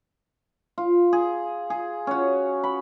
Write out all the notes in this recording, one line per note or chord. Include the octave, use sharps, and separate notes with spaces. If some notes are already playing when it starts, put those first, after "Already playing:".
F4
G#4
G#4
C#4 F#4
B5